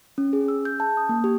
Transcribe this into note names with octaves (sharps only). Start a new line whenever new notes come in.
C#4
G#4
E6
G6
A5
D#6
A#3
G4